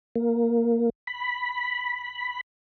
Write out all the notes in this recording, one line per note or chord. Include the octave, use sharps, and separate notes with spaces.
A#3
B5